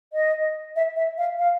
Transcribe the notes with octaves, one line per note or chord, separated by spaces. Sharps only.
D#5
E5
E5
F5
F5